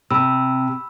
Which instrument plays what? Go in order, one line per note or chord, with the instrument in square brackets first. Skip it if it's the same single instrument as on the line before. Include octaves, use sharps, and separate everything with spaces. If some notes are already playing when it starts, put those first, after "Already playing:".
[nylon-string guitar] C3 [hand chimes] B5 E6